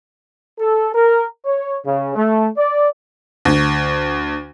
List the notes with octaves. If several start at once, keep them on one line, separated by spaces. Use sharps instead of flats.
A4
A#4
C#5
C#3
A3
D5
D2